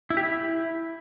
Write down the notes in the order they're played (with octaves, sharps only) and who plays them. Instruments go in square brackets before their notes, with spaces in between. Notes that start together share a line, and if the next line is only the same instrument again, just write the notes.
[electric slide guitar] E4
G4
E4